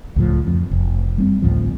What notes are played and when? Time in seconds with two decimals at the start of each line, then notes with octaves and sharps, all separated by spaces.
0.16 C#2 A2 F3
0.47 F2
0.71 F1
1.18 G3 B3 C4
1.42 A1 D2 A2 F3